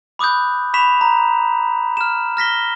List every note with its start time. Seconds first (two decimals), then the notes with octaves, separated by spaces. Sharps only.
0.19 B5 D6 D#6 F#6 G6
0.74 B5 C#6 B6 E7 F7
1.01 A#5
1.97 F6 E7
2.37 F6 A#6 B6 G7